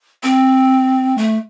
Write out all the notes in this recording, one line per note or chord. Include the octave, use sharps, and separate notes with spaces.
C4
A3